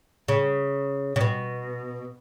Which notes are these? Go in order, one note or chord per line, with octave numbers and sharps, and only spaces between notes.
C#3
C#3
B2